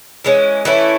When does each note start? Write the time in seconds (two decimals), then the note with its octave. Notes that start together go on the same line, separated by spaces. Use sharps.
0.24 E3 G#3 C#4
0.65 E3 A3 C#4 E4